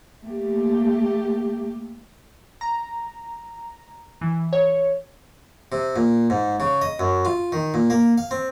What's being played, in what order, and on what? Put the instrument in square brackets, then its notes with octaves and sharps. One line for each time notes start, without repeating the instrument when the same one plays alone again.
[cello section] A3 A#3 G4
[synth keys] A#5
E3
C#5
[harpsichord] C3
A#2
G#2
C#3
D#5
F#2
F4
D#3
A#2
A#3
F5
C4